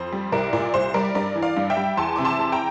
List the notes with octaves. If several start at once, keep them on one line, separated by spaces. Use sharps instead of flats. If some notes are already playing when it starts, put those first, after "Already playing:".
Already playing: F2 C5
G3
C2 A#4 D5
A#2 A#4 D5
C2 C5
G3 A#4 D5
G2 A#4 D5
E3
D5 F5
G2
E5 G5
G3
E2 A5 C6
C3 D6
A5 C6
E2
G5 A#5